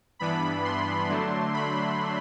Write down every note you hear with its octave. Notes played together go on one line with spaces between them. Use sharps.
G2 E3 B3 D4 B5
C6
D3 F#3 A3 D4
B5